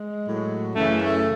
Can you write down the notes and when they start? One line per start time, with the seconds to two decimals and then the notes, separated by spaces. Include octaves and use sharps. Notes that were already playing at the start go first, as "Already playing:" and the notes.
Already playing: G#3
0.24 A2 F#3
0.75 F#2 C#3 E3 A3
1.01 A3